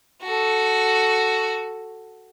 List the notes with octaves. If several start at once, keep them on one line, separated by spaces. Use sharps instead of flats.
F#4 A4